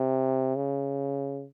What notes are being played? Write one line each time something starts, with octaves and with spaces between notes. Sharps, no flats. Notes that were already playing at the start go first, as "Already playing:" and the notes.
Already playing: C3
C#3